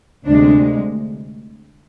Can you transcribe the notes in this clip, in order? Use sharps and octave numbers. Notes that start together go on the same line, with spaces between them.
D2 C3 G#3 D4